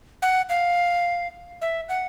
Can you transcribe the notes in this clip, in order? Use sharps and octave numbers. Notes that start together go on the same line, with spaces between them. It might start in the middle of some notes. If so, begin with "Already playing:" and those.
F#5
F5
E5
F#5